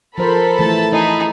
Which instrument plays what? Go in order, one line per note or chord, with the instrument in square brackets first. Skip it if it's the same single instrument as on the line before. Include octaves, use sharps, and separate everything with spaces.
[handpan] F3 C5 [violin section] A4 B5 [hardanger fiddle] A#4
[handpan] E3 A3 [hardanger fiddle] A5
[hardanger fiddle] D#4 G#4 [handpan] E4 D#5